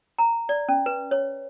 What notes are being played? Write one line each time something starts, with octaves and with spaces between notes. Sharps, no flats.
A#5
D5
C#4
B4
C#5